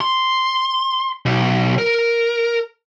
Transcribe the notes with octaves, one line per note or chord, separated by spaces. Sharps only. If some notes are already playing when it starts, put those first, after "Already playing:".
C6
B1
A#4